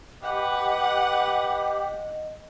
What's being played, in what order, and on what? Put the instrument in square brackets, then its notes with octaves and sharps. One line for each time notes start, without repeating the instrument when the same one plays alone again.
[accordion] G4 [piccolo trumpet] B4 [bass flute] D#5 [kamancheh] F#5